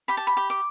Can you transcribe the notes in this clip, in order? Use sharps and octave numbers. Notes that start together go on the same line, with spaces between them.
G4 B5
A5
B5
G4
D6